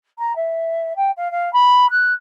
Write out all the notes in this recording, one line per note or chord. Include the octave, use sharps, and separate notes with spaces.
A#5
E5
G5
F5
F5
B5
F#6